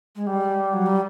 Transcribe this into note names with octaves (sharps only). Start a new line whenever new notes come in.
G#3
G3
F#3
G3